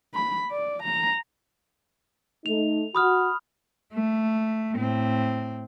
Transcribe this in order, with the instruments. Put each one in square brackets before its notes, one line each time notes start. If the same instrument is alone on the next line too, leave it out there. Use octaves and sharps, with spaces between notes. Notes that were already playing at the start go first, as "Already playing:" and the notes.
[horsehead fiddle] B5
D5
A#5
[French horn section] A3 D#4 [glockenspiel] F7
[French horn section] F#4 [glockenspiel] B5 D#6 F6
[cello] A3
A2 C4